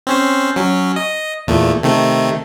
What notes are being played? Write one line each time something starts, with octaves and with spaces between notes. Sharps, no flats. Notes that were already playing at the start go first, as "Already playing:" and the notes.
C4 C#4 C5
F#3 C#4
D#5
E2 A#2 A3
C3 D#3 A3